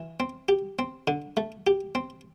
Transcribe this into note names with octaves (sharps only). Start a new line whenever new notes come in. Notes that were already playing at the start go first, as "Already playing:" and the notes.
Already playing: E3
C4
G4
C4
D3
A3
G4
C4